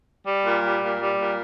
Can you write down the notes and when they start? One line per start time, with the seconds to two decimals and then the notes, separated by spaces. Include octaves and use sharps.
0.24 G3
0.43 A#2
0.62 G3
0.81 A#2
0.98 G3
1.18 A#2